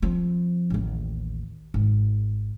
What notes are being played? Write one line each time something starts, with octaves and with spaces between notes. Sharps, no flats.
F3 C4
A1 D#2
G#1